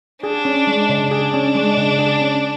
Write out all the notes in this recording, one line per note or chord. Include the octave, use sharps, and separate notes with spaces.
D4 G#4
C#4
G#3
C#3
D4 G#4
C#4
G#3
C#3
G#4
C#4